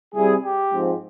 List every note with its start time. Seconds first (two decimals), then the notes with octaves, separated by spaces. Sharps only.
0.15 C3 G3 C4 E4 G#4
0.45 G4
0.73 G#2 F3 C4